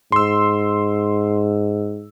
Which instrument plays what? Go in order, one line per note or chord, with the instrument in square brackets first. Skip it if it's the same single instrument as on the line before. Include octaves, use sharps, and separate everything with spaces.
[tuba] G#2 [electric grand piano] C6 E6